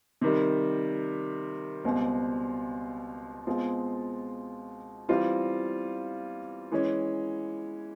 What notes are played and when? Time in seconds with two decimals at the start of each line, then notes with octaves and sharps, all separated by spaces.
0.21 C3 D#3 G3
1.84 C#2 B2 G3 C4
3.47 B2 G#3 C4 F4
5.09 E3 G3 C4 F4
6.72 E3 G#3 C#4